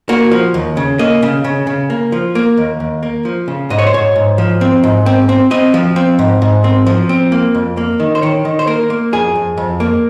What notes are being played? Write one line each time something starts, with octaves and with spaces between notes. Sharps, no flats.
A#3 F#4
F3
D#2
C#3
A#3 D#5
C#3
C#3
C#3
A#3
F3
A#3
D#2
D#2
A#3
F3
C#3
G#2 D#5
C#5
C5
G#2 C#5
G#2
F3
C4
G#2
C4
C4
C4 D#5
F3
C4
G#2
G#2
C4
F3
C4
A#3
F2
A#3
D#3
C5
D#3 C#5
D#3
C5
A#3 A#4
A#3
F2 G#4
F2
F2
A#3